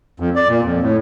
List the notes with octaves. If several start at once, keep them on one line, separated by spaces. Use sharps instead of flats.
F2
D5
A#2
F2
A2